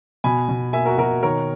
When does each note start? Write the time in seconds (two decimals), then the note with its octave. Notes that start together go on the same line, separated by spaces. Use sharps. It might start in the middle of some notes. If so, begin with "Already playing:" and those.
0.24 B2 G#5 B5
0.49 B2
0.73 A#3 E5 G#5
0.86 F#4 A#4
0.98 B2 F#4 A#4
1.23 D#3 A#4 C#5